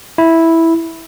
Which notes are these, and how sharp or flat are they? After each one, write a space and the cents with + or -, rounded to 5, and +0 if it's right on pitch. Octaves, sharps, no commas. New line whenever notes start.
E4 -5